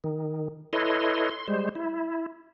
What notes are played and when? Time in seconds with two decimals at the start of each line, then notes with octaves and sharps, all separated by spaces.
0.04 D#3
0.73 E4 A4 B4 C#5 D#5 C6
1.31 C6
1.48 G3 G#3 C5
1.75 E4